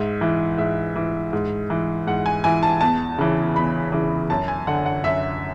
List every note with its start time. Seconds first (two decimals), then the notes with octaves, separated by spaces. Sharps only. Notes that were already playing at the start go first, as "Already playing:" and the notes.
Already playing: G#2 E5
0.21 E3
0.58 G#2 E5
0.96 E3
1.33 G#2
1.70 E3
2.07 G#2 F#5
2.26 G#5
2.44 E3 G#5
2.63 A5
2.81 E2 A5
3.18 C#3 E3
3.55 E2 B5
3.92 C#3 E3
4.30 F#2 A5
4.48 G#5
4.67 D3 F#5
4.86 F#5
5.04 F#2 E5